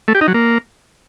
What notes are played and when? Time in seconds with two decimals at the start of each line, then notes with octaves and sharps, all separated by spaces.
0.08 A3
0.15 G4
0.21 D#4
0.28 F#3
0.34 A#3